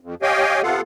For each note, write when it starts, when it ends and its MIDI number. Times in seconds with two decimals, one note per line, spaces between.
0.01 0.15 41
0.22 0.62 67
0.22 0.62 73
0.22 0.62 75
0.22 0.62 77
0.22 0.62 79
0.22 0.62 80
0.63 0.81 48
0.63 0.81 59
0.63 0.81 65
0.63 0.81 69
0.63 0.81 77
0.63 0.81 78